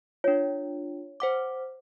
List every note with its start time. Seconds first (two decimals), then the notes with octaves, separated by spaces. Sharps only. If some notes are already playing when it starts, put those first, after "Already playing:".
0.24 D4 F4 C#5
1.20 C5 F#5 D6